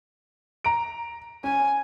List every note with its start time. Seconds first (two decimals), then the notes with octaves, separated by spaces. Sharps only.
0.65 A#5 D7
1.44 C#4 G#5